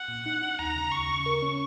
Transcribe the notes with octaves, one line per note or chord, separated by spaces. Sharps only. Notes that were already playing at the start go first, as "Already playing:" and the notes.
Already playing: F#5
A#2
D#4
D#4
D#2 A#5
C#3
D#2 C#6
C#3
A#4
C#4